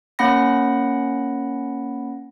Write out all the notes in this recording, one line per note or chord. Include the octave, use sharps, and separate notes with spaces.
A#3 C#4 F#5 B5 A#6